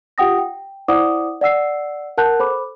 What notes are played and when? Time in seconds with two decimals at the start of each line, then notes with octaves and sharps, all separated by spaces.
0.18 F4 G4 F#5 G5 D#6 A#6
0.38 G5
0.88 E4 C5 D5 F#5 D6 D#6
1.41 D5 F#5 E6 C7
2.18 A#4 F#5 A5 F#6 G6
2.39 A4 C5 B5 D6